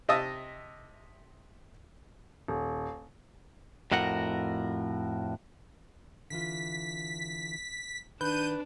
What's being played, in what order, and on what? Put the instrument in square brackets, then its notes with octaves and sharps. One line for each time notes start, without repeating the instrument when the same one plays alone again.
[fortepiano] C3 D#5 E5 A5 D#6
[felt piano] D#1
[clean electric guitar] F2 A2 F#4 A#4 F#5
[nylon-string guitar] D3 E3 F4 [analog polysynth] B6
[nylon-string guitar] D#3 [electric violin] D4 [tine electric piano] B4 [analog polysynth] G6 D#7